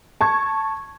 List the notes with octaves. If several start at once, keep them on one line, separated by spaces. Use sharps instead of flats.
A5 C#6 G#6